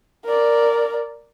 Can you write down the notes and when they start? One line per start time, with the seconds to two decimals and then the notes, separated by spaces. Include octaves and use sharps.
0.25 A#4 D5